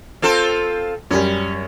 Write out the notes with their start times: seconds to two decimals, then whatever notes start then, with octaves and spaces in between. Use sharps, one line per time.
0.22 C4 F4 A4
1.11 F#2 G3 C#4